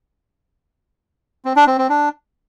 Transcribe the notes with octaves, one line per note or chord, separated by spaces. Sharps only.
C4
D4
C4
C4
D4